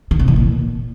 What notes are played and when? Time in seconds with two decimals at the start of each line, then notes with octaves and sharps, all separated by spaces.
0.11 D#3
0.19 C3
0.28 E3
0.36 A#2